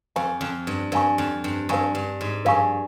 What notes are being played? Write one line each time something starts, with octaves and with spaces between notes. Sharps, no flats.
F2 A#4 F5 G#5 C#6
F2
G2
G2 A#4 F5 G#5 C#6
F2
G2
G2 A#4 F5 G#5 C#6
G2
G#2
G2 A#4 F5 G#5 C#6